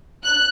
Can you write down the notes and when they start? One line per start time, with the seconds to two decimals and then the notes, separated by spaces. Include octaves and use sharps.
0.24 F#6